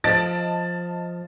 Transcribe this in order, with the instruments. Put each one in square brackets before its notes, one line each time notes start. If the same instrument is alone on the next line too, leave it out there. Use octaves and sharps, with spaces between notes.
[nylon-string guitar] F3 A4 [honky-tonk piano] D#5 A5 D7 [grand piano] A6